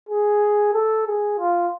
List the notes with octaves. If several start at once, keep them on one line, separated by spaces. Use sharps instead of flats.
G#4
A4
G#4
F4